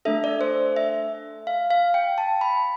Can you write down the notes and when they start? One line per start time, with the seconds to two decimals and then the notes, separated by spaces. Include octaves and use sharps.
0.05 A3 D4 A4 E5
0.24 D5
0.41 C5
0.76 E5
1.47 F5
1.70 F5
1.94 G5
2.18 A5
2.41 B5